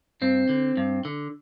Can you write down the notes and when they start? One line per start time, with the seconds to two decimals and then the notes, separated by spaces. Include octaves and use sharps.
0.21 G2 C4
0.49 D3
0.77 G2
1.05 D3